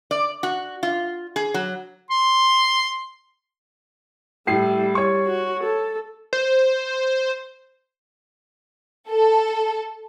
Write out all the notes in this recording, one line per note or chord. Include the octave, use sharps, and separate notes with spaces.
D5
F#4
F4
G#4
F#3
C6
A2 G3 E4 C7
G3 C#5 C#6
F#4
A4
C5
A4